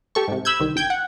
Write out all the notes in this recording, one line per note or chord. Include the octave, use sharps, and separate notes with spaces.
G4 A4 C#6
G#2 C3
B5 E6 G6 G#6
C2 D#3
G1 G5 G6 G#6
F#5